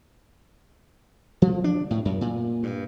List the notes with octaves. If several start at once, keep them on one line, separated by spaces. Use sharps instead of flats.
F3
D4
A2
F#2
A#2
G2